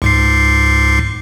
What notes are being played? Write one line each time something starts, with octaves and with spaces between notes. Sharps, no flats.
C#2 G#2 C7